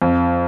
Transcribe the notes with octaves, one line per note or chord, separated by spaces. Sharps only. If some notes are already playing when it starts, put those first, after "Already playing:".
F2